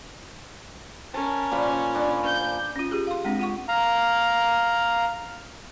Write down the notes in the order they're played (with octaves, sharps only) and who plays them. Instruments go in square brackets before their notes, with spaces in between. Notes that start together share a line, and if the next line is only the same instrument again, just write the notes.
[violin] C#4 [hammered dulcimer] A#4 A5
[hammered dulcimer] A#2 F3 B5
D4 G#5
[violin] G6
[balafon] C#4 F4
F4 G4 G#4
F5 C6
G#3 C4 D4
F4 F#5 C#6
[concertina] F5 A#5